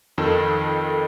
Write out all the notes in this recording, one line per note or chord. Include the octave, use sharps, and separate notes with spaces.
F2 D#3 A4